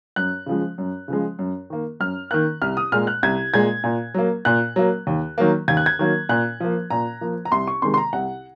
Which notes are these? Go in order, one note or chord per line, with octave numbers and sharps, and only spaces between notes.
F#2 F#6
C#3 F3 G#3
F#2
C#3 F3 G#3
F#2
D#3 A#3
F#2 F6
D#3 A#3 F#6
C2 F6
D#6
A#2 G#3 F6
F#6
C2 G#6
A#2 G#3 G#6
A#2
F#3 A#3
A#2 F#6
F#3 A#3
D#2
D#3 F#3 A#3
D#2 G#6
F#6
G#6
D#3 F#3 A#3
A#2 F#6
F3 A#3
A#2 A#5
F3 A#3
A#5
C2 C6
C#6
C3 D#3 G#3 C6
C6
A#5
C2 F#5